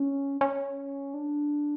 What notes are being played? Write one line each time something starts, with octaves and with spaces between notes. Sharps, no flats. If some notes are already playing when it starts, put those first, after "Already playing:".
Already playing: C#4
C#4
D4